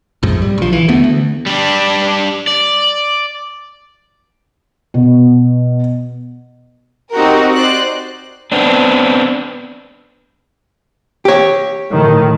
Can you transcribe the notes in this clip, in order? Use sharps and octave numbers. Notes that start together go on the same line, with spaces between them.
A#1 F2 G#2
G3
A#1 F3
E3
D2 A3 B3
D2
G3 D4
D5
B2
C4 D#4 F#4 G4 A#4
C5 D5 D#5 F#6
B3 C4 D4
G4 C#5
A2 D#3